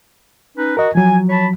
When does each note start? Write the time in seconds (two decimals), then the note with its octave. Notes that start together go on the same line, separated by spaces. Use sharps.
0.56 C#4 D#4 B4
0.77 F#4 A#4 D#5
0.95 F3 F#3 G#5
1.29 C#5 A5 B5